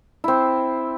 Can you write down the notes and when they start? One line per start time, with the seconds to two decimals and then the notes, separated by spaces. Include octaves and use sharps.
0.24 C4 E4